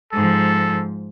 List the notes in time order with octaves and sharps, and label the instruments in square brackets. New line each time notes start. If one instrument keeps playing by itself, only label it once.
[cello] G#2 F3 [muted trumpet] A4